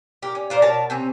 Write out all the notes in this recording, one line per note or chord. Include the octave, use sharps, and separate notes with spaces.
G4 A#4
C#4
F4 A#4 C5 D5
B2 A#4 C#5 A5
C3 C4 C#4